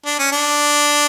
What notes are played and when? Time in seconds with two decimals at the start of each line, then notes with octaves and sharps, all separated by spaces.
0.06 D4
0.19 C#4
0.32 D4